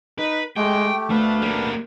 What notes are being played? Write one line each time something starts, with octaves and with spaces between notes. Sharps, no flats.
D#4 B4
G#3 A3 G4 G5
D2 A3 B3 D4 F5
G3 A#3